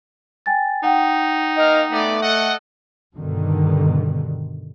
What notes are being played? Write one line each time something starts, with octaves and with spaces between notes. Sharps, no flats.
G5 G#5 A6
D#4 F#5 G5
A#3 A#4 D#5 F5
A3 B3 D5
A4 D#5 F#5
G2 B2 D3 D#3